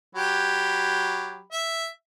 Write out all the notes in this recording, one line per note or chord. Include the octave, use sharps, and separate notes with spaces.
F#3 G4 B5
E5